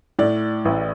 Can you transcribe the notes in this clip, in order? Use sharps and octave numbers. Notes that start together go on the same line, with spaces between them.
A2 D5
A1